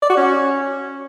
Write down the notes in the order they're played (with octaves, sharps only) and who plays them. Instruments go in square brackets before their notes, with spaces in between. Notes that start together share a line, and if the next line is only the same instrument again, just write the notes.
[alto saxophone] D5
F#4
C#4